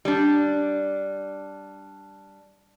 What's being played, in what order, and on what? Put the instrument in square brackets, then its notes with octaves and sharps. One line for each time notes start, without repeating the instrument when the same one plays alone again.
[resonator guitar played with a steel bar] G3 D4